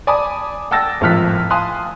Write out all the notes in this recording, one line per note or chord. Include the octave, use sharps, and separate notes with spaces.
D5 G#5 A5 B5 D6 D#6
F#5 G5 A5 E6 A6 A#6
G#1 A2 F3 F6 F#6 B6
F5 G#5 A5 C6 D#6 F#6